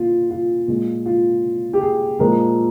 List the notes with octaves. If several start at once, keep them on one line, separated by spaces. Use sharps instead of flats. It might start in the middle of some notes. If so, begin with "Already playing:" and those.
Already playing: A#2 F4
F4
A#2 G#3
F4
G4
G#4
A#2 F3 G#3 A#4